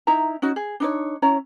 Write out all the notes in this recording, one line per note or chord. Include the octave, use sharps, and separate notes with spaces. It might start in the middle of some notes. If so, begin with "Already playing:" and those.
D#4 E4 E5 A#5
C#4 D#4 F#4
G#4
D4 D#4 C#5
C#4 E4 C#5 A#5